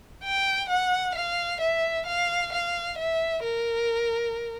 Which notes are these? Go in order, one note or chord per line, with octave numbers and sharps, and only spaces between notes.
G5
F#5
F5
E5
F5
F5
E5
A#4